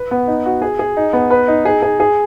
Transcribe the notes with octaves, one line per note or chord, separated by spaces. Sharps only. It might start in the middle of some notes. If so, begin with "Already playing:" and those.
Already playing: B4
B3
D#4
F#4
G#4
G#4
D#4
B3
B4
D#4
G#4
G#4
G#4